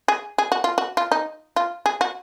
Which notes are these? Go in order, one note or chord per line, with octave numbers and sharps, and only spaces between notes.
G#4
G#4
F#4
F4
F#4
F4
D#4
F4
G#4
F#4